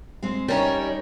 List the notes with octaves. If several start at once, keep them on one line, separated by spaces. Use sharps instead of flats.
G#3 C4
G3 C#4 D#4 A#4 C#5